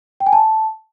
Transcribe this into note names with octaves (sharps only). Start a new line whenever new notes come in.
G5
G#5
A5